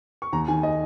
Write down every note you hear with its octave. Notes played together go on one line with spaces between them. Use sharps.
C#6
D#2 A#5
D#3 G#5
D#5